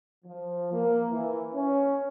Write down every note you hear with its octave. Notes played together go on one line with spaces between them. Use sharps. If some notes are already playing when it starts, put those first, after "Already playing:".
F3
A#3
E3
C#4